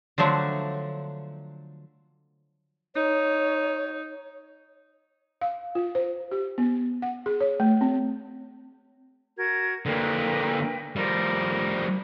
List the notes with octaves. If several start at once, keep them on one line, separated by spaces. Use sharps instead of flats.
D3 F3 F#3 A3 D4
D#4 C#5
F5
F4
C5
G4
B3
F#5
G#4
C#5
A3
C4
F#4 A#4 G#6
D3 A#3 A#4 B4 G5
F3 G3 A#4